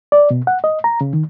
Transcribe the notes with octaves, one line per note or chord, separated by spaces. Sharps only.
D5
B2
F#5
D#5
A#5
C#3
D#3